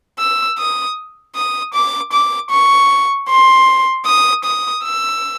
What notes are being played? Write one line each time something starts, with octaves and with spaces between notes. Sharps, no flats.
E6
D#6
D#6
D6
D6
C#6
C6
D#6
D#6
E6